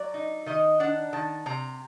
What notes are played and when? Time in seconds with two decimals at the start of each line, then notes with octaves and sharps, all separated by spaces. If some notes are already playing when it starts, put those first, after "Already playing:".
Already playing: F#3 D5
0.14 D#4
0.46 D#3 D#5
0.80 D4 F#5
1.13 D#3 A5
1.46 C3 A#5